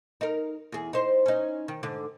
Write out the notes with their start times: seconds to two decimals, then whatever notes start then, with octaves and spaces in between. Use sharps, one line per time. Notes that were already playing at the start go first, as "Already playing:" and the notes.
0.21 D#4 A#4
0.72 E2 G#4
0.93 D#4 C5
1.26 C#4 D#4
1.68 D#3
1.83 G#2 D3